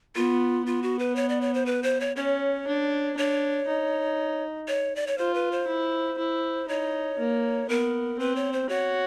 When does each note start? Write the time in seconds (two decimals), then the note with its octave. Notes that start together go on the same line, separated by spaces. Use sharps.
0.15 B3 F4
0.66 B3 F4
0.83 F#4
0.99 B4
1.16 C#5
1.29 D5
1.41 C#5
1.54 C5
1.66 B4
1.83 C5
2.00 C#5
2.16 C#4 C#5
2.67 D4
3.17 D4 C#5
3.68 D#4
4.68 C#5
4.96 D5
5.07 C#5
5.18 F4 C5
5.34 B4
5.52 C5
5.68 E4
6.18 E4
6.68 D#4 C#5
7.19 A#3
7.69 B3 A#4
8.19 C4 B4
8.36 C#5
8.53 C5
8.69 F#4 C#5